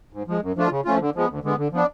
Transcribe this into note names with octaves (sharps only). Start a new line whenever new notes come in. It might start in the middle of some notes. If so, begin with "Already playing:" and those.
G#2
F3 G#3
F#2
F3 A3 D4 F4
C#3
F3 A3 C#4 F4
D3
F3 G#3 B3
D2
D3 G#3 B3
D3
F3 B3 D4